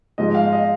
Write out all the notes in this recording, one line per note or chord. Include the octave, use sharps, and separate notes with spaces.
G#2 F3 G#3 D#5
F5
D#5